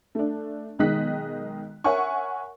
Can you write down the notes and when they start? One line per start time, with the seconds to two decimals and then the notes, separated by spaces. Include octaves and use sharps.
0.15 A3 D4
0.79 B1 D#3 G#3 D#5 F#6 B6
1.84 A#4 C#5 E5 F#5 G#5 C#6